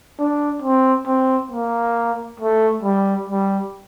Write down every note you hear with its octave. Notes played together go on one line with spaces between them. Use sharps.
D4
C4
C4
A#3
A3
G3
G3